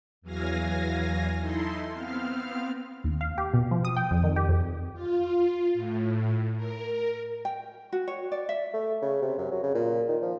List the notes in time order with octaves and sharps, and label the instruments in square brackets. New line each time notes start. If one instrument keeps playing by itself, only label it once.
[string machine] E2 E3 F#3 F5 G#5 A#6
D#4 E4 A4 C6
B3 C4 F5 F6
[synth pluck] D#2
F5
G4
B2
F3
D#6
G5
F2
D#3
G4
F2
[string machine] F4
A2
A#4
[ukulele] G5
F#4
C#5
D5
E5
[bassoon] A3
C#3
C3
F#2
F#3
C#3
A#2
D#3
F3